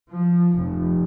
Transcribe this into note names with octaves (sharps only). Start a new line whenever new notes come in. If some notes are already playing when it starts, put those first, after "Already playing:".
F3
F1